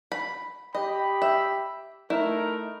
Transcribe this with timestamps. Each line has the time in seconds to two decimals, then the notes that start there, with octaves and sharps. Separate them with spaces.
0.12 B5
0.75 G4 D#5 G5 B5
1.22 E5
2.10 A3 D#4 E4 A#4